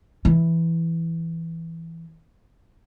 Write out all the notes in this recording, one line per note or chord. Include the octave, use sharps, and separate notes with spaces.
E3 E4